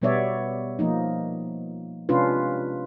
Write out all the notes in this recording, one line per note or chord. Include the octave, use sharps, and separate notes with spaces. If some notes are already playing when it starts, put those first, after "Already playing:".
B2 G3 B3 C#5 D5 E5
F3 A#3 D#4
C3 G#3 C#4 D4 F4 B4